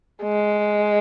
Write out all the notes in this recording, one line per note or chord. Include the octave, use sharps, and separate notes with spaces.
G#3